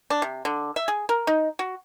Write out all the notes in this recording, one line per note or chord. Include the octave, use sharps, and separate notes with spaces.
D4
C3
D3
E5
G#4
A#4
D#4
F#4